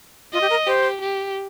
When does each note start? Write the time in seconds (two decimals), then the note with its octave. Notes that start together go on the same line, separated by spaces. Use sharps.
0.33 F4 D#5
0.41 G4
0.50 A#4
0.67 G4 C5
1.01 G4